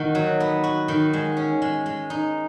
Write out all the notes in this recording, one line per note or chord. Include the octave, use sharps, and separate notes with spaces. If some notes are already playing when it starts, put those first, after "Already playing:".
Already playing: D#3 A#3 D#4 F#4
F#3
B3
F#4
D#3
G#3
C#4
G#3
G#3
D#4